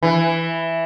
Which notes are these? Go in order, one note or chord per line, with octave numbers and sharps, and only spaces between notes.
E3